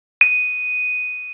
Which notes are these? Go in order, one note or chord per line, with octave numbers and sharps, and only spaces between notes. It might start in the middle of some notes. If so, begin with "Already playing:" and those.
D#7